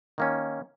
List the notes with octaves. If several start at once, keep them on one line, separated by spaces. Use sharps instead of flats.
D#3 A#3 C#4